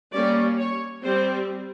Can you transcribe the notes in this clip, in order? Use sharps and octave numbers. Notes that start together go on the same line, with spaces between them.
G3 A#3 C#4 D5
C#5
G3 C4 C5